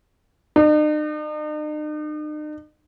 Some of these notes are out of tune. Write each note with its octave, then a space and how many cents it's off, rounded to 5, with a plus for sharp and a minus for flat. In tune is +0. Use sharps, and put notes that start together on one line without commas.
D#4 -45